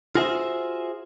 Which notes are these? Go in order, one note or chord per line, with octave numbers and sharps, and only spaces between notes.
F4 F#4 G#4 C5 E5